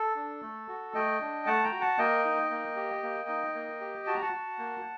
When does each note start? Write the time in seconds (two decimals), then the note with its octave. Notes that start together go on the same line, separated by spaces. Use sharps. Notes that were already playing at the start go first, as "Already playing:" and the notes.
Already playing: A4
0.16 D4
0.42 A3
0.68 F#4
0.94 A3 D#5 G5
1.21 D4
1.46 A3 F#5 A5
1.64 G5 A#5
1.72 F#4
1.81 F#5 A5
1.98 A#3 D#5 G5
2.25 D#4
2.51 A#3
2.76 G4
3.03 A#3
3.29 D#4
3.54 A#3
3.81 G4
4.07 F#4 A5
4.14 A#5
4.22 F#5 A5
4.33 F#4
4.59 A#3